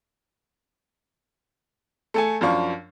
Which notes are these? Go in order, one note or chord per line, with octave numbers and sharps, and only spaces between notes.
A3 A4 G#5
F#2 F3 D4 F5 C#6